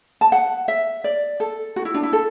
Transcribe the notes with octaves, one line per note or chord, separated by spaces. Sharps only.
A5
F#5
E5
D5
A4
F#4
E4
D4
E4
A4